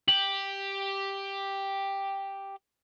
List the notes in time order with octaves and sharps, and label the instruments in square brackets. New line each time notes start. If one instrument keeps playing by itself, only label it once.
[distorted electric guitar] G4 [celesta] F#7